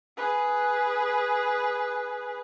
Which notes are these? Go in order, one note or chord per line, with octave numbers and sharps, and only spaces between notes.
G#4 B4